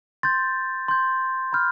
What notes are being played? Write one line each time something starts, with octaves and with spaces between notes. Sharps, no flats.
C6 G6 A6
C6 G6
B5 F6 G6